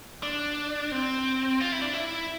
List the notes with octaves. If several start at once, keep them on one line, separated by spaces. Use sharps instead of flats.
D4
C4
F4
E4
D4
E4